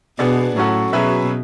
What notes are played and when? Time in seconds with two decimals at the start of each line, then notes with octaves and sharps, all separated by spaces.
0.19 B2 B3 D4 G#4 D5
0.56 A2 F#3 C#4 F#4 A4
0.93 B2 F#3 C#4 G#4 B4 E5